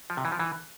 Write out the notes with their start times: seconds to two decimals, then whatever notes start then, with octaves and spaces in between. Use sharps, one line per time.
0.10 F3
0.17 C3
0.25 E3
0.32 F3
0.39 E3